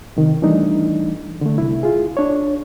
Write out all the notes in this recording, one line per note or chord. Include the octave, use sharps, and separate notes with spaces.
C3 D#3
E3 G3 A3 D4 D#4
D3 A3
C2 E4
F4 G#4
D4 C#5